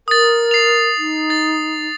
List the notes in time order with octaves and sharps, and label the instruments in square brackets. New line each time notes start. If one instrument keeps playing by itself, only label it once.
[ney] A#4 [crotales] D#6 A6
[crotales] C7 F7
[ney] D#4
[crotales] A6